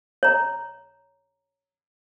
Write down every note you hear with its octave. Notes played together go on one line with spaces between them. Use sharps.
C#5 A#5